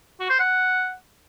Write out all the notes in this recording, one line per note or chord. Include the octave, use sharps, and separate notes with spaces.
F#4
C5
F#5